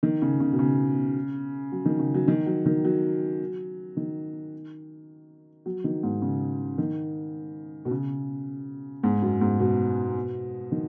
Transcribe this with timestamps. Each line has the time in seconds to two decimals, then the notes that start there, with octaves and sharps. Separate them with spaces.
0.03 D#3
0.22 C#3
0.40 C#3
0.52 B2
0.59 C#3
1.72 F#3
1.85 D#3
2.00 C#3
2.14 F#3
2.28 D#3
2.46 F#3
2.66 D#3
2.85 F#3
3.97 D#3
5.66 F#3
5.84 D#3
6.03 G#2
6.22 C#3
6.78 D#3
7.85 B2
7.91 C#3
9.03 G#2
9.22 F#2
9.41 G#2
9.60 B2
10.72 D#3